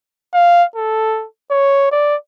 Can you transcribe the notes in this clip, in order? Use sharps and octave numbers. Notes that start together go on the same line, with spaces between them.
F5
A4
C#5
D5